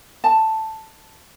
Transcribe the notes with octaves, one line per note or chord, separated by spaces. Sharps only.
A5